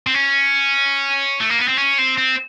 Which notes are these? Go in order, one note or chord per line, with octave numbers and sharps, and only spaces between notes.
C4
C#4
A3
A#3
B3
C4
C#4
C4
C4